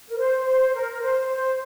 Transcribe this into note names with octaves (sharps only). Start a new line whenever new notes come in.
A#4
C5
C5
A#4
C5
C5